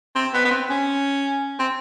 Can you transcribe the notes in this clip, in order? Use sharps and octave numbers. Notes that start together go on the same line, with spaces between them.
C4
B3
B3
C4
C#4
C4